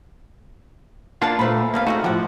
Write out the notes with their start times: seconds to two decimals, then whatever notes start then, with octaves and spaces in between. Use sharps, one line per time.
1.22 A#3 D4 F4 F5 F#5 A5
1.39 A#2 A3 B4 C5 B5
1.74 G3 A#3 B3 D4 F5
1.87 D3 G#3 A3 C4 D#4 F#4
2.04 A2 F3 G4 F#5